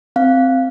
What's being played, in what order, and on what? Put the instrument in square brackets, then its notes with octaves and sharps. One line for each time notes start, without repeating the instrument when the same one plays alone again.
[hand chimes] C4 F5